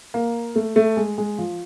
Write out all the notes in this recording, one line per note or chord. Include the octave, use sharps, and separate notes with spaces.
A#3
A3
A3
G#3
G#3
F3